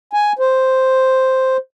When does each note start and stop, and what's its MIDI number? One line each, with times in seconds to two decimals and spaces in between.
0.13 0.32 80
0.39 1.57 72